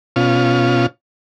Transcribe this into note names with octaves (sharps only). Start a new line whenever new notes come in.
B2 C#4 F4